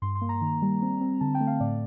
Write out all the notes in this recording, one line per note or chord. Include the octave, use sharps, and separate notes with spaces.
G2 C6
C6
A#3
A#5
D#3
G3
C4
C4
D3 A5
G5
A3
F5
A2 D5